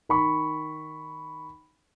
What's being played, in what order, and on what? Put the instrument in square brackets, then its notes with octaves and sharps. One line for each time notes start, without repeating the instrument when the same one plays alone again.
[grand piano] D#3 B5 C#6